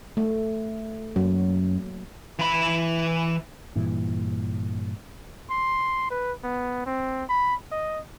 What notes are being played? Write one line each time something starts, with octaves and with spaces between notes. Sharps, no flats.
A3
F#2 F#3 A#3
E3 B5
G2 A#2 E3
C6
B4
B3
C4
B5
D#5